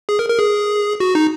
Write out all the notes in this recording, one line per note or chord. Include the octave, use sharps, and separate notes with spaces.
G#4
A#4
A#4
G#4
F#4
D#4